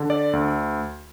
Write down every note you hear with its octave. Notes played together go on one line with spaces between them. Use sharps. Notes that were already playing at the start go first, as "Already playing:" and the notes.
Already playing: D3
D5
D2